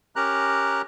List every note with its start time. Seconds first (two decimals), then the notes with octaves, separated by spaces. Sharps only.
0.16 C#4 G4 A#4 A#5 F#6